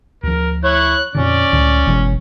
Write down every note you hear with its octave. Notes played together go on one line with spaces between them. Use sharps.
D2 F3 A#4
E4 C#5 F#6
F2 A#2 D3 C#4 D5
C#2 A2 D3
F#1 B2 E3 G#3